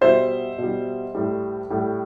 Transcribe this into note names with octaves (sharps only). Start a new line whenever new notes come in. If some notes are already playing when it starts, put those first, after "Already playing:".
B2 G3 C5 E5
B2 G3
A2 G3
A2 G3